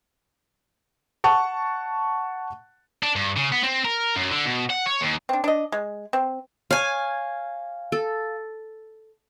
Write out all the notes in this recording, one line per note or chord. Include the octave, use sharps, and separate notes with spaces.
F#5 A5 C#6
D4
G2
C#3
B3
C4
A#4
F#2
D3
B2
F#5
C#5
D#2
C4 D4
D4 D#5
G#3
C4
C#5 F5 G#5
A4